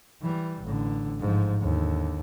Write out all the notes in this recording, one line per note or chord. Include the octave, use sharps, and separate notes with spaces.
E3 G3
A1 D3
G#2 F3
D#2 D3